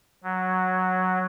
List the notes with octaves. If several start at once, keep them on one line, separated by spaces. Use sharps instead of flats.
F#3